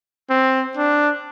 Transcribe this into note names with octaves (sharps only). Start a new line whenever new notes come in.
C4
D4